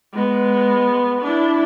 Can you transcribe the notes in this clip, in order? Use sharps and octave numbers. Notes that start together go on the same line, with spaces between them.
G#3 B3
D4 E4